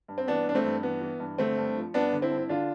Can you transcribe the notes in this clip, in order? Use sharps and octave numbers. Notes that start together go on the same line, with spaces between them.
G2
C4
E3 B3 D4
G2 D4
A3 C4
G2
E3 B3
E3
G2
D3 A3 C4
G2
F3
G2 B3 D4
D3
C4 E4
G2
E4
D3 D4 F4